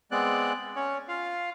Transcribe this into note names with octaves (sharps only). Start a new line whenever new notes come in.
G#3 B3 C4 D5 F#6
C#4 C#5
F4 F5